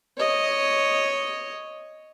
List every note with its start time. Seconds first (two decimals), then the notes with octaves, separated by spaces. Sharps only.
0.17 C#5 D#5